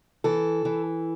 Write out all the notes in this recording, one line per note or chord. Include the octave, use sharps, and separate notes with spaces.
E3 A4
E3